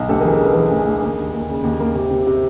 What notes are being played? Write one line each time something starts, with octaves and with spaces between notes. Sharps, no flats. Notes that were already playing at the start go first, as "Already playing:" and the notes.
Already playing: B1
D2 G4 A4
G#4 A#4
E3
G#4 A#4
C#3 A4 B4
E3 G#4 A#4
D2
G#4
D2
A#3 G#4
D#2
A#3
C#3
D#2
A#3
C3 G4
C3
C3